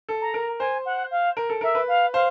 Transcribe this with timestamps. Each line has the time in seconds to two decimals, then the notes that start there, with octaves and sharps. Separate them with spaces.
0.09 A4
0.21 A#5
0.34 A#4
0.59 C5 G#5
0.85 F#5
1.11 F5
1.37 A#4
1.49 A4
1.61 A#4 E5
1.75 B4
1.88 F5
2.13 C5 F5